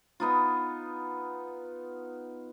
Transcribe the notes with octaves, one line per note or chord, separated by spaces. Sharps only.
B3 D#4 F4